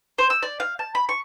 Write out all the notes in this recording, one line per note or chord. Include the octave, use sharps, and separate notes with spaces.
C5
E6
D5
F5
A5
B5
C#6